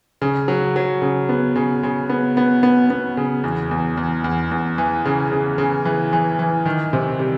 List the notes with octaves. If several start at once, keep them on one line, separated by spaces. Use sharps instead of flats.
C#3
F#3
F#3
C#3
B3
C#3
C#3
B3
B3
B3
B3
C#3
E2
E2
E2
E2
E2
E3
C#3
C#3
C#3
E3
E3
E3
D#3
C3
G3